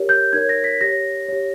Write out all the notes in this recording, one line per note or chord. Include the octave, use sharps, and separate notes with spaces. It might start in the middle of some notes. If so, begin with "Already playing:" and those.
Already playing: G4 A#4 C#5
G6
D#4 A#4 C#5 G#6
A#6
B6
G4 C#5 A#6
G4 C#5